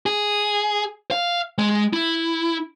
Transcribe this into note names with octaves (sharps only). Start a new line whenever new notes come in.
G#4
F5
G#3
E4